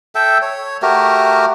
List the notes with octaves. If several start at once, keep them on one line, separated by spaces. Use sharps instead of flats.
A4 E5 G5
C#5
A3 F#4 G4 A#4